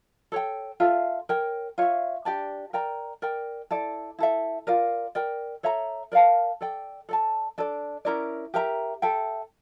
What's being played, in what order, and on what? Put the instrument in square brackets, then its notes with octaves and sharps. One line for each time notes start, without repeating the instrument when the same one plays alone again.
[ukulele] A4 C#5 G5
F4 A4 E5
A#4 C#5 G5
F4 C#5 E5
D4 G4 D5 A5
A#4 D5 G5 A#5
A#4 D5 G5
E4 A4 D5
E4 A4 E5
F4 A#4 D5
A#4 D5 G5
A4 C#5 E5 A#5
A#4 D5 F5 A5
A4 D5 G5
A4 D5 A5
D4 A4 D5
C#4 E4 A#4 D5
G4 A#4 E5 A#5
A4 E5 G5